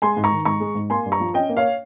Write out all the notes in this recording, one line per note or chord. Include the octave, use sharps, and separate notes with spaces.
G#3 G#5 C6
G#2
A#5 C#6
D#3
G#2 A#5 C#6
G#3
G#2
A#3 G#5 C6
G2
A#5 C#6
F3
C#4 D#5 G5
A#3
C#5 F5